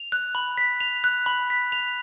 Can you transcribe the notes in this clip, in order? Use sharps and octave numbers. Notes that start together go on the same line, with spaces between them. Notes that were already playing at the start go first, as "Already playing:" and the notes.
Already playing: F7
F#6
B5
B6
F7
F#6
B5
B6
F7